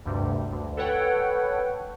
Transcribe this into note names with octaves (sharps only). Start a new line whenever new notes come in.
D2 G2 C3
D2
A4 B4 C#5 F#5 G5